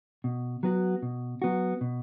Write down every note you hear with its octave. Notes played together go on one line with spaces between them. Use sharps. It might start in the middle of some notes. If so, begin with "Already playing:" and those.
B2
F#3 B3 F#4
B2
F#3 B3 F#4
B2